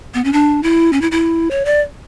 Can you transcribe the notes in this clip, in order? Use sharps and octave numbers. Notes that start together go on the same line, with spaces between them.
B3
C#4
D4
E4
C#4
E4
E4
C#5
D5